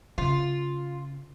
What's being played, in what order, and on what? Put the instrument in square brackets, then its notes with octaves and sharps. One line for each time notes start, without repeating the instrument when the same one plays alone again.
[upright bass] C#3 [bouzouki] F4